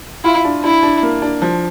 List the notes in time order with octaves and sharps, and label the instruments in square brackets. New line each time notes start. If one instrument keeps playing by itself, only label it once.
[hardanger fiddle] E4 [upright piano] F4
[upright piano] D4
[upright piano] D4 [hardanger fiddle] E4
[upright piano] D4
A#3
D4
F3